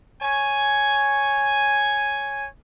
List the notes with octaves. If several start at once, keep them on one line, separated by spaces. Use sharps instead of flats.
C#5 G#5